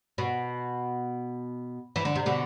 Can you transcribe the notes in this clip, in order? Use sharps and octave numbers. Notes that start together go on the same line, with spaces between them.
B2
E3
D3
C3
B2 D3